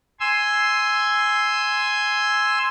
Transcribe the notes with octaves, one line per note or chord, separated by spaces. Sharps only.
G#5 C6 E6